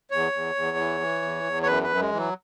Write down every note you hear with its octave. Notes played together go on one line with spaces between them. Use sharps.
E2 C#5
E2
E2
E3
E3
E2
E2
C#5
F#2 B4
B4
F#2
F#3
G#3
E3 F#3